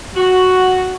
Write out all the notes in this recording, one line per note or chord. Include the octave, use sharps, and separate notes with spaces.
F#4